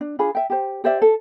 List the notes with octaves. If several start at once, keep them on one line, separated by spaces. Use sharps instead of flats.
D4
D4 F4 G#4 B5
E5 G5
G4 C5
G4 C5 D5 E5
A4